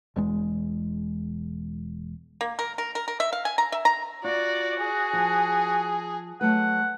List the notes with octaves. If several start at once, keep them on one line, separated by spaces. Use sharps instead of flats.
E1 E2 G#3
A#3
A#4
A#4
A#4
A#4
E5
F5
G#5
A#5
E5
A#5
F4 F#4 D5
G#4
F3
F#3 A3 B4 F#5